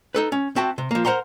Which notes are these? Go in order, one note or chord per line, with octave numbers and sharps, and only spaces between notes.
D#4 A4 B4
C#4
C4 F#4 E5 G5 A5
C3
F3 A#3
A#4 C5 F#5 A#5 C6